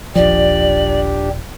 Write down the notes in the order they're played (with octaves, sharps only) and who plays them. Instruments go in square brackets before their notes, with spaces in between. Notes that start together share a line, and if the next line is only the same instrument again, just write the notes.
[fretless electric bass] D#1 F3 [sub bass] A1 [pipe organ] D4 G4 [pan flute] D5